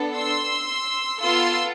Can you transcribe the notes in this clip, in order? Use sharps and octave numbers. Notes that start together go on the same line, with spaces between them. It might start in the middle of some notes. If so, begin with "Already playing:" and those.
Already playing: B3 D4 A4
C6 E6
B3 F4 A4 C6 E6